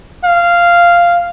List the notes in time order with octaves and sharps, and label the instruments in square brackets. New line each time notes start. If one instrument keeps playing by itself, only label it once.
[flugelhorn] F5